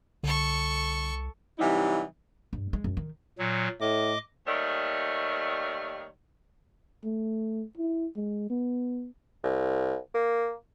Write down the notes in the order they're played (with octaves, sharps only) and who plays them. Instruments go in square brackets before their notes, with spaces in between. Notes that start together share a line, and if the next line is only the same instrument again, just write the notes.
[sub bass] C2 [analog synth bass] D3 [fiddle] A4 C#6
[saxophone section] C3 E3 F#3 G3 D#4 E4
[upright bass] G2
G#3
F#2
D#3
[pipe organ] A#2 F#3
[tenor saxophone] A2 [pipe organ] D#5 D6
[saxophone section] D#2 D#3 G3 A3 C#5
[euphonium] A3
E4
G#3
B3
[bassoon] C2
A#3